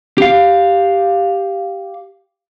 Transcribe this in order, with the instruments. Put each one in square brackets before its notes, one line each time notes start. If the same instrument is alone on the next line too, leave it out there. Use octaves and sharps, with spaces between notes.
[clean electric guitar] G4 F5